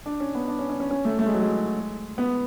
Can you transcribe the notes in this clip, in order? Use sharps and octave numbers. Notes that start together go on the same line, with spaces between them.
D4
C#4
B3
D4
C#4
C#4
C#4
C#4
A3
A3
G#3
F#3
G#3
B3